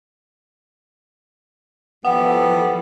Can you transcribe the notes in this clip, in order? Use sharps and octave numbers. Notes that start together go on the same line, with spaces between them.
E3 F3 G3 B3 A4 F#5